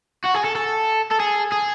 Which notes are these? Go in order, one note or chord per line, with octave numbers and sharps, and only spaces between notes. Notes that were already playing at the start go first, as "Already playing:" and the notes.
F#4
G#4
A4
A4
A4
G#4
G#4